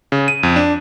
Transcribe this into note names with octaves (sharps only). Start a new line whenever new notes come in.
C#3
D#7
F2
D4